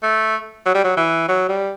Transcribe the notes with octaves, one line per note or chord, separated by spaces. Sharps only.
A3
F#3
G3
F#3
E3
F#3
G3